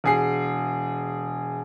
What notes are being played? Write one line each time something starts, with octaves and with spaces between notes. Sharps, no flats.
E1 G#4 C7